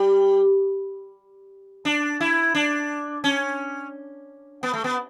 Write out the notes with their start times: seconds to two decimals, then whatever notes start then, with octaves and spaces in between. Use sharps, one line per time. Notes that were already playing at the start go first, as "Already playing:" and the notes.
Already playing: G3
1.85 D4
2.21 E4
2.55 D4
3.24 C#4
4.63 B3
4.74 A3
4.84 B3